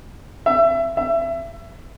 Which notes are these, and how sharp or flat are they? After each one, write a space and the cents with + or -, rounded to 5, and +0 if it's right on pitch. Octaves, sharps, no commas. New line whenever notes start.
E5 +25
E5 +25